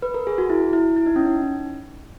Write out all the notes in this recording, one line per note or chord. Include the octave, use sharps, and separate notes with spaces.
B4
A#4
G#4
F#4
E4
E4
E4
D#4
C#4
D#4